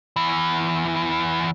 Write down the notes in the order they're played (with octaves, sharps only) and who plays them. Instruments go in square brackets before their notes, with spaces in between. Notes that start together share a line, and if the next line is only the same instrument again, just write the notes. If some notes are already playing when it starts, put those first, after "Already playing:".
[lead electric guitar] E2 E3